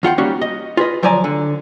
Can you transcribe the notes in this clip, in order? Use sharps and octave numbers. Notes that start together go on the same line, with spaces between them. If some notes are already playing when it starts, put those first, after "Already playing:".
E2 F4 F#5 G5
G3 A#3 C#4 D#4 F#4
D#5
F4 G#4 B4 D#5
D2 F3 F#3 D5 G#5 A#5
D3